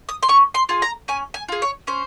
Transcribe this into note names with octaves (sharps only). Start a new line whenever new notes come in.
D#6
C6
C#4 C#6
C6
F4 G#4
A#5
C#4 G#5
G#5
F4 G#4
C#5
C#4 C5